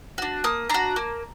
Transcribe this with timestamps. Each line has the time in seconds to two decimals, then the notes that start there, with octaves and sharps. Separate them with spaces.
0.18 D4 F#4
0.44 A#3 D#6
0.69 D4 F#4 A#5
0.96 A#3